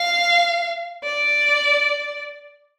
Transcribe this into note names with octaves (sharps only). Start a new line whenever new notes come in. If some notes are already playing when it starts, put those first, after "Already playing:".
Already playing: F5
D5